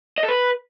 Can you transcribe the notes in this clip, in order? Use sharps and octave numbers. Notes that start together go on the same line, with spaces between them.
D#5
A4
B4